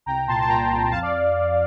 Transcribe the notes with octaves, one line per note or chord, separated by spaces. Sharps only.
C2 G5 A#5
A#2 A5 C6
A5
A#2 G5 A#5
C2
F2 F5 A5
D5 F5